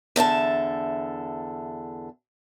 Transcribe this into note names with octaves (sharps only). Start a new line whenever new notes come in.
E2 D3 E5 A5